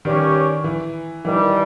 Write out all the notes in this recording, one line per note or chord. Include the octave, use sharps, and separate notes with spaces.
G2 D#3 G3 C#4 G4 C#5
E3
G2 D#3 E3 G3